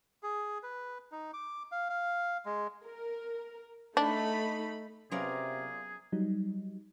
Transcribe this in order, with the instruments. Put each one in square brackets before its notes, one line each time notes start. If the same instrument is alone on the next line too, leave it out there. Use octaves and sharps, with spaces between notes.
[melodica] G#4
B4
D#4
D6
F5
F5
G#3
[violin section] A#4
[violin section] A3 D#4 B5 [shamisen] D4
[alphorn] C3 [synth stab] F#3 B3 C#4 [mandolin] F4 A#4 D5 [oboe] G#4
[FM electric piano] F#3 G3 D#4